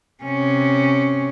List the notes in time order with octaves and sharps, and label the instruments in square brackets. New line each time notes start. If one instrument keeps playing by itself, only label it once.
[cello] C3 C#4